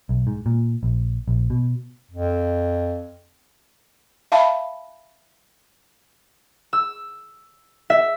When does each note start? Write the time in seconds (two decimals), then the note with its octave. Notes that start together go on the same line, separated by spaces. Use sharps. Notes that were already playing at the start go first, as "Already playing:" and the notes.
0.09 B1
0.27 G#2
0.46 A#2
0.83 A#1
1.28 A#1
1.50 B2
2.11 F2
4.32 E5 F5 A5 B5
6.73 E6
7.90 E5